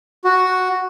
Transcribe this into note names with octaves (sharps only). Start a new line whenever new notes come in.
F#4